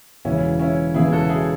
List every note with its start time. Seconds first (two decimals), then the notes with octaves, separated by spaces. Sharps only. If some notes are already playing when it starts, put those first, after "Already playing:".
0.25 E1 E2 C#3 E3 C#4 E4
0.60 C#4 E4
0.94 E1 E2 C#3 E3 E4 G#4
1.12 F#4 A4
1.29 E4 G#4